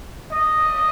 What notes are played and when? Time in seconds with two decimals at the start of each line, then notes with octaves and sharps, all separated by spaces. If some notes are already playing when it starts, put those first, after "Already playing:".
0.32 D#5